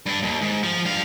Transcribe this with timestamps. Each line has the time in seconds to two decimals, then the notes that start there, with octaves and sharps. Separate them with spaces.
0.06 G2 D4
0.23 D#2
0.42 G#2
0.63 F3
0.85 G2 F5